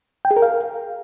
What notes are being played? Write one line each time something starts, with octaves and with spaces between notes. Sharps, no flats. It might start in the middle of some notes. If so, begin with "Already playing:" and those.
G5
G#4
A#4
F5